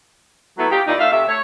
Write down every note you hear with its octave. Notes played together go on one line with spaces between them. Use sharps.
F#3 A3 B3 E4
D#4 F4 G4
A#2 D#3 D#4 E4 D5
A3 F4 E5 F5
C3 A3 E5
A3 C#5